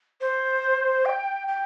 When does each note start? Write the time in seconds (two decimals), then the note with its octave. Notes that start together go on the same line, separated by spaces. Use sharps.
0.21 C5
1.05 G5
1.48 G5